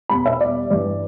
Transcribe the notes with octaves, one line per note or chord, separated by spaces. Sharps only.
E2 B2 G3 B5
E5
D5
G2 E3 G3 D5